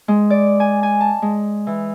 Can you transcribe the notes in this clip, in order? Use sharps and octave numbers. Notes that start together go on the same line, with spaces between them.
G#3
D5
G#5
G#5
A5
G#3
E3